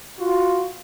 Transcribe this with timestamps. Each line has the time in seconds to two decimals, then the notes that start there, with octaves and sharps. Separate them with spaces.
0.19 F4 F#4